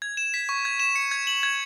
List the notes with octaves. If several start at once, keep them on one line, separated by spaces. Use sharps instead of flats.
G#6
E7
B6
C#6
G#6
E7
C#7
G#6
F#7
G#6